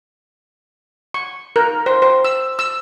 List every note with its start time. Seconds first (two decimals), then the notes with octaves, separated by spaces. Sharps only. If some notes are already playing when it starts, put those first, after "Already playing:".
1.14 C#6
1.56 A#4
1.86 C5
2.02 C5
2.25 E6
2.59 E6